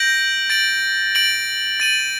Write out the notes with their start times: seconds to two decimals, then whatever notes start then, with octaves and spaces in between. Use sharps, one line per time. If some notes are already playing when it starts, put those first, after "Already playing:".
Already playing: G6 A#6 D7 F#7
0.50 A6 D7 F#7
1.15 A6 D7 F#7
1.80 A6 D#7 F#7